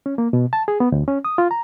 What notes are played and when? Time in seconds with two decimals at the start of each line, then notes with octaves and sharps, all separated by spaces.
0.06 C#4
0.18 A#3
0.33 B2
0.53 A5
0.68 G#4
0.80 B3
0.92 D2
1.08 C#4
1.25 D#6
1.38 F4
1.51 A#5